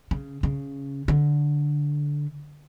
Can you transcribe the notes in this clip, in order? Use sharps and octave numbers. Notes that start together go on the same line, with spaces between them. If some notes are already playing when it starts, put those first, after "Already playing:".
C#3
C#3
D3